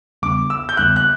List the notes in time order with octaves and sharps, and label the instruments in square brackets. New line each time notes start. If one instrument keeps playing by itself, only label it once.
[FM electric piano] E2 C#3 G3 B3 D4 [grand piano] D6
[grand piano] E6
G6
[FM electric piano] E2 C#3 G3 B3 D4 [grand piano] F#6
[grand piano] F#6